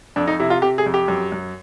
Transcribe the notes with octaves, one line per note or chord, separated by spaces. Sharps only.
F2 D4
D#4
C3 E4
F4
C3 G4
G#4
F2
G4
F#2
F#2